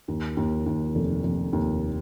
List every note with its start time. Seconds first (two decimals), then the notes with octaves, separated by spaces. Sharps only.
0.08 D#2
0.37 D#2
0.66 D#2
0.95 F1
1.23 F1
1.53 D#2